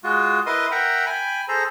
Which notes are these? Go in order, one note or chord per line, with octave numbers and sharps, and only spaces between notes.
G#3 F4 F#4
E4 A#4 B4 D#5 C6 D#6
A#4 E5 F#5 G5 A#5
G5 G#5 B5
G#4 A4 C5 A#5